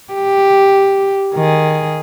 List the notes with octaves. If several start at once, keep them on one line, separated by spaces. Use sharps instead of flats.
G4
D#3 G#4